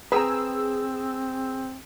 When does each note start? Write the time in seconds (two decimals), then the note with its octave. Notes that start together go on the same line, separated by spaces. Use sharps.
0.12 C4 G#4 B4 G5 A#5 E6